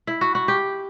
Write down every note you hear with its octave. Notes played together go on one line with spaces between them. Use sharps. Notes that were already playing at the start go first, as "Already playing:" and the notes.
E4
F#4
F#4
G4